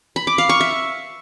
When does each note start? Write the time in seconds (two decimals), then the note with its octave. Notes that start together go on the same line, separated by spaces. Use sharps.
0.16 B5
0.27 D6
0.38 F5
0.49 C#6
0.61 E5